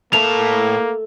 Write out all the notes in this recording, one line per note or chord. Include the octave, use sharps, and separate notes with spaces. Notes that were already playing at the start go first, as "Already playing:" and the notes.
A2 A3 A#3 A4 A#4 A5 F7